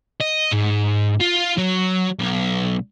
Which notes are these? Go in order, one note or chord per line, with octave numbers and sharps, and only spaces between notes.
D#5
G#2
F4
F#3
B1